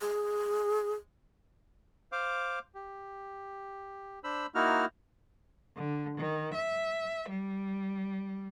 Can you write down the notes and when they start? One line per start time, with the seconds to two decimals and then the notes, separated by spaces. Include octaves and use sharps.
0.01 G#4
2.12 C5 F5 D6
2.75 G4
4.24 D4 C5 B5 E6
4.55 A#3 D#4 E4 F#4 F6
5.76 D3
6.18 D#3
6.54 E5
7.29 G3